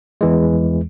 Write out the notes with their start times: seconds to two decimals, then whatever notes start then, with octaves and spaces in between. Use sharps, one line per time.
0.21 E2 E3 G#3